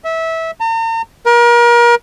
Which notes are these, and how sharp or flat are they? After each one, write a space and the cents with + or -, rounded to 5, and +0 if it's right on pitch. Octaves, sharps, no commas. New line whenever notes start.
E5 -20
A#5 -45
A#4 +35